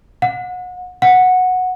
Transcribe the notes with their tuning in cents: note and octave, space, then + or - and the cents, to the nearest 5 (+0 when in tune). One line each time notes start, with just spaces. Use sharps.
F#5 -30
F#5 -10